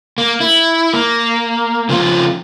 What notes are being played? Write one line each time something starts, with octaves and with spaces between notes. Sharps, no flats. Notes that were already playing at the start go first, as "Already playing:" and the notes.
A#3
E4
A#3
C#3 F3 C4 F4